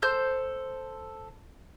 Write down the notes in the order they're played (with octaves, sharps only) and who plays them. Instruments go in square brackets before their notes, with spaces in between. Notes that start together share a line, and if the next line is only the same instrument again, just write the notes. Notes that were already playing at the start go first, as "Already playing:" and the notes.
[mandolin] A4 C5 G6